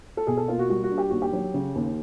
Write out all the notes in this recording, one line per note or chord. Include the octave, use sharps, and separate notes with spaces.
A4
B2 G#4
A4
A#3 F4
F#4
G3 F#4
F#4
D4
G4
D#2 F#4
G4
F#3
C#3
D#2